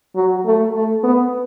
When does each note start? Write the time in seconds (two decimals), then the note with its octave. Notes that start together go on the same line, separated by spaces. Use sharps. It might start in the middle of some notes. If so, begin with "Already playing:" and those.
0.16 F#3
0.46 A3
0.75 A3
1.04 B3